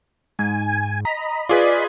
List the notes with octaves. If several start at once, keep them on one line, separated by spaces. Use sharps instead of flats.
G#2 G#5
D#5 A#5 B5
F4 G#4 B4 D5